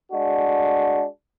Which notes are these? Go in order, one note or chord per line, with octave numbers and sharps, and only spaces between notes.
G#3 D4 F#4